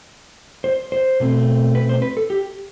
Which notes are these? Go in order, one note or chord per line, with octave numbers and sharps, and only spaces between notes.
C5
C5
B2 A3 C4
B4
C5
B4
A4
G4